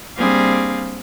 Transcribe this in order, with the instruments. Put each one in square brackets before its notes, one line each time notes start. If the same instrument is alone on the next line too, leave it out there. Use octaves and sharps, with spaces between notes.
[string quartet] G3 A#3 C4 D4 G#4 F5